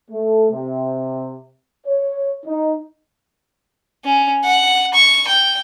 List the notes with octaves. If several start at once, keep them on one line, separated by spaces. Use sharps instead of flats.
A3
C3
C#5
D#4
C#4
F#5
C#6
G5